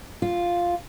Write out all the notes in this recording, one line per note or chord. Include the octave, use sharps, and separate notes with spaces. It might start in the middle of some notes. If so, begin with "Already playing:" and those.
F4